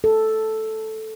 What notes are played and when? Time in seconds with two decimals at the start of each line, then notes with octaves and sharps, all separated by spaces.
0.04 A4